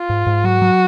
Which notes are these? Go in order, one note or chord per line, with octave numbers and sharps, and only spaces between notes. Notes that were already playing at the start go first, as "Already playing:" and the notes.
Already playing: F4
G#2
G#2
F#3 F#4
F#3